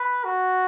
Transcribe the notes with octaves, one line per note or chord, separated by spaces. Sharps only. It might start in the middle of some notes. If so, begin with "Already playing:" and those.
Already playing: B4
F#4